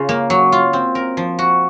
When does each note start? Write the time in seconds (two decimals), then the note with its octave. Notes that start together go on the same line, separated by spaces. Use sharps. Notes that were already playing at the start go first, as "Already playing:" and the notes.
Already playing: C#3 F4
0.09 A#3
0.30 F#3
0.52 F4
0.73 C4
0.95 A#4
1.17 F3
1.39 F#4